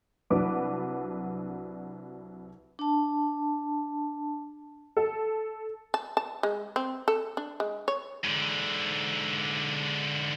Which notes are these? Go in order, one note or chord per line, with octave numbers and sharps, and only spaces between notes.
C2 F#3 D4 B4 D6
D4 A5
A4
A5
A5
G#3
C4
A4
D4
G#3
C#5
G#2 D3